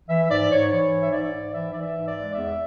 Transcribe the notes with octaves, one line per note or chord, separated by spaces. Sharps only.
E3 E5
G#2 D5
G#2 C#5
E3 C#5
G#2
E5
G#2 D5
G#2
E3 E5
E3 D5
E5
G#2
D5
G#3
E2 E5